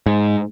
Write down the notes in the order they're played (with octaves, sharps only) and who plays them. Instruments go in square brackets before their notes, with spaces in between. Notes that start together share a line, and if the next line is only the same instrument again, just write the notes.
[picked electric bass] G#2